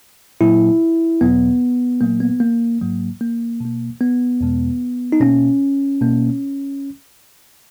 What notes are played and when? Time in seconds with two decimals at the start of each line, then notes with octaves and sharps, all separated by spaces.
0.41 A#2 F#3 A#3 E4
1.21 E2 B2 F#3 B3
2.01 A#2 F#3 A#3
2.20 B3
2.40 A#3
2.81 G#2 F#3 A#3
3.21 A#3
3.60 B2 A#3
4.01 B3
4.41 E2 B2 G#3
5.12 D#4
5.21 B2 A#3 C#4
6.01 B2 A#3